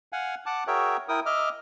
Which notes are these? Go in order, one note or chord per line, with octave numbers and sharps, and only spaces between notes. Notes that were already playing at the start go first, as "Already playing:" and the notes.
F5 F#5 G#5
F#5 A5 D6
F#4 G#4 A#4 C#5 E5 G5
E4 A#4 G5 D#6
D#5 E5 D6 F6